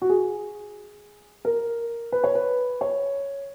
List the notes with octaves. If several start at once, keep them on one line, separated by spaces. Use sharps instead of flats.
F#4
G#4
A#4
B4
C#5
B4
C#5